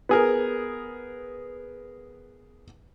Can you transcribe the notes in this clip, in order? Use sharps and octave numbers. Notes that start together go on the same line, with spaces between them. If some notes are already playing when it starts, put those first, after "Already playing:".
B3 G#4 A#4